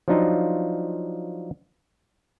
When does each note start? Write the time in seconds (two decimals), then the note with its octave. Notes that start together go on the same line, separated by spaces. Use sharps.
0.08 F3 F#3 D4 D#4 F4